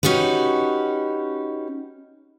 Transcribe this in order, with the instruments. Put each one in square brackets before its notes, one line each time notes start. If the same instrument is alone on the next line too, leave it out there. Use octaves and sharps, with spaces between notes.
[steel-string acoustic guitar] C#4 D#4 F#4 G4 B4